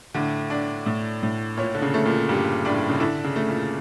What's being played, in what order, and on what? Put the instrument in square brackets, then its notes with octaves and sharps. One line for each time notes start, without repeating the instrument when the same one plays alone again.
[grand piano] A2 [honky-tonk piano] D3
[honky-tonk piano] D4
A2
A2
[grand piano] A#2 [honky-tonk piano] C#5
[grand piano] D3
C#3
[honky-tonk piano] A3
[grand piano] A#2
[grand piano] G2 [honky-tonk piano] G3
[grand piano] A2 [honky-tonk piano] D4
[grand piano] C#3
[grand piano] D3 [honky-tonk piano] E4
[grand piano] C#3
[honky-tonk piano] A3
[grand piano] A#2